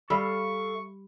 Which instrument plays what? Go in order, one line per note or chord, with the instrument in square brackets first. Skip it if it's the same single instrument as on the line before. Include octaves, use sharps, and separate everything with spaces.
[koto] G3 [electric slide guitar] A4 E5 F5 [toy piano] B5 [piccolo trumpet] C#6